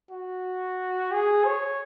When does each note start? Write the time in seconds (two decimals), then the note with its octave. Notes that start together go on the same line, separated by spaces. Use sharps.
0.10 F#4
1.12 G#4
1.45 C#5